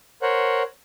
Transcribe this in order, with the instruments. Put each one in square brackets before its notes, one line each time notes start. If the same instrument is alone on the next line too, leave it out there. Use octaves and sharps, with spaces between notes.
[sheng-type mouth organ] A#4 C5 C#5 F#5